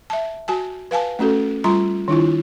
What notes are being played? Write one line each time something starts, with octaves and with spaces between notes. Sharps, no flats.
E5 A5
F#4 G#5 A5
B4 F5 G#5 A5
A3 C#4 F#4 A4
G3 F4 A#5 C6
D#3 D4 E4 F4